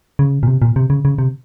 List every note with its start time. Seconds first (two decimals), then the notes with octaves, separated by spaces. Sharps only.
0.19 C#3
0.43 A#2
0.48 C3
0.62 A#2
0.76 C3
0.90 C#3
1.05 C#3
1.18 C3